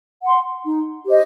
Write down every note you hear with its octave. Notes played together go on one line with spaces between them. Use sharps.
F#5 C6
D#4
G4 C5 D#5